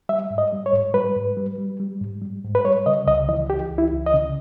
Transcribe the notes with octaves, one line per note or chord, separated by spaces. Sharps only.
G3 E5
G#2
D#5
G3
C#5
G#2
G3 B4
G#2
G3
G3
G3
G#2
G3
G#2
B4
G3 C#5
C#3 D#5
C#2 D#5
E3 D#5
E3 G4
C#2
E4
C#2
D#5
C#3